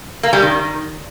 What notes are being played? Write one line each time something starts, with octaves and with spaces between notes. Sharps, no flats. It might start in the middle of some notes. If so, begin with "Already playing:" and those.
A#3
G3
D#3